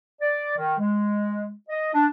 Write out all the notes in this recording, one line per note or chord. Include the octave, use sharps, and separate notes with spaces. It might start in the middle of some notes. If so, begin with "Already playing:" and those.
D5
D#3
G#3
D#5
D4